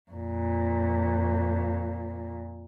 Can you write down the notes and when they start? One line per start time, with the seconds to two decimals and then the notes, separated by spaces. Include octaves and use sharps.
0.11 F2 A#2